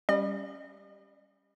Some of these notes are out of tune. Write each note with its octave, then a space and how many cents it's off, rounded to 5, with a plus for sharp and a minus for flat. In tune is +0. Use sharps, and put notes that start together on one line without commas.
G3 +5 C#4 +0 D#5 -40